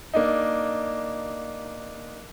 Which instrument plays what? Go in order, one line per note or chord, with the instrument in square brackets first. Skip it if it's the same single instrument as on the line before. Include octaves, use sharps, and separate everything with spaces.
[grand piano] A#3 D4 D#4